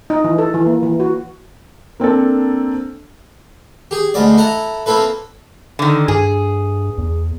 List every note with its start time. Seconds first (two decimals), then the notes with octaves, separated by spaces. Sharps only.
0.10 D#4
0.24 E3
0.38 A4
0.54 E3
0.66 A#3
0.83 E3
1.00 F#4
2.00 A#3 C4 D4 A4
3.91 G4 G#4
4.14 D2 G#3 B3 D5
4.37 E4 A4 F#5 A5 A#5
4.86 A#3 C4 E4 A4 B4
5.79 D3 D#3
6.08 G2 G#4
6.98 E2